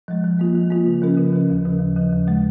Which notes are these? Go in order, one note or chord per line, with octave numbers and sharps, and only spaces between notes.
F3 G#3
F3
A#3 F4
F3
A#3 F4
C#3
F3 C#4 A#4
C#3
F3 C#4 A#4
D#2
C#3 F3
D#2
C#3 F3
D#2
C#3 G#3